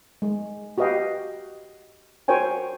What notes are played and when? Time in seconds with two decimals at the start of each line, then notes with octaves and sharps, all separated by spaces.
0.22 G#3
0.78 F#4 G4 B4 D#5 F5 G5
2.28 F#4 A#4 C5 C#5 G5 G#5